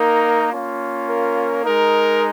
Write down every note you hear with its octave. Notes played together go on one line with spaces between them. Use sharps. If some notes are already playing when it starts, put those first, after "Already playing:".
Already playing: A#3 D#4 A#4
A#3 C#4 F4
A#4
G#3 D#4 A#4